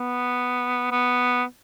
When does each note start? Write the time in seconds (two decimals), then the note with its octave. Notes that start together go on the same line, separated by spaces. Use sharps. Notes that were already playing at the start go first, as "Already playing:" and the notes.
Already playing: B3
0.91 B3